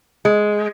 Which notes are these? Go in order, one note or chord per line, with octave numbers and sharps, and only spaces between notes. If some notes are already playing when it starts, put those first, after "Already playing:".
G#3